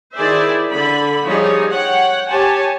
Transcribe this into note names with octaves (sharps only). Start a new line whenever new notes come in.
D#3 E4 G#4 C5 D5 E5
D3 B5
F3 G3 D#4 G#4 C#5
C#5 F#5 G5
G4 C#5 G#5 A5